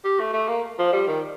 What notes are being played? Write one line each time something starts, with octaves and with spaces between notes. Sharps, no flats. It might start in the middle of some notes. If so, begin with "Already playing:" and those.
G4
A3
A3
A#3
F3
G3
D#3